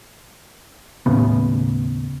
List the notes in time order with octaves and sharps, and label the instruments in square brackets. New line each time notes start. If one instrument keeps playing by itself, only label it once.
[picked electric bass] D#2 A2 C#3 B3